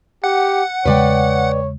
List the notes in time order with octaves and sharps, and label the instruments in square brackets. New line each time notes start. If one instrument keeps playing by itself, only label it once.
[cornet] G4 [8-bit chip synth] F#5
[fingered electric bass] E2 C#3 G#3 [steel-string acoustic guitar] B4 D5 G5 [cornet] C#5